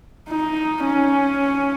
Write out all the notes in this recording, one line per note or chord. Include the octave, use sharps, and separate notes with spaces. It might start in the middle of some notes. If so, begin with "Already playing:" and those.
D#4
C#4